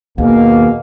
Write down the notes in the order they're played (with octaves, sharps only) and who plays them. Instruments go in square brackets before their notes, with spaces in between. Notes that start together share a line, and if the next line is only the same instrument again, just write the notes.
[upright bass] D#2 [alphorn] B2 [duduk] A#3 [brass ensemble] G#4 F5